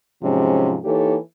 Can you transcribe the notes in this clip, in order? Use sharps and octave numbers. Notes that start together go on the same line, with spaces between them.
G#2 C3 F3 F#3 G#3 C#4
E3 A#3 D#4 G4 A4 C#5